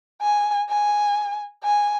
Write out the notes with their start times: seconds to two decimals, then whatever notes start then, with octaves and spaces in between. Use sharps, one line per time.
0.22 G#5
0.70 G#5
1.64 G#5